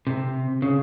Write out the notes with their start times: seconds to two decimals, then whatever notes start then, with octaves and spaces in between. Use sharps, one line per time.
0.07 C3
0.62 C#3